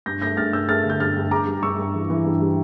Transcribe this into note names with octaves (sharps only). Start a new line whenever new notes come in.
G2 G6 A#6
A3 G6 A#6
G2 F6 A6
G2 E6 G6
A3 F6 A6
D3
G6
G2 F6 A6
G2
G2 A#5 D6
G3
G2 C#6 E6
G2
E3
E3
G2
G3